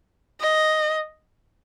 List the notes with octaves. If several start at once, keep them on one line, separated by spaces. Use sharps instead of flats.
D#5